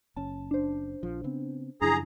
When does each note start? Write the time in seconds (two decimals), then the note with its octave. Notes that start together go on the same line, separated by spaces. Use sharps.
0.16 F#1 C#4 A5
0.51 D4 C5
1.03 A#1 F3
1.24 C#3 B3 C4
1.81 F#2 C#3 F3 D4 E4 G#4 A#5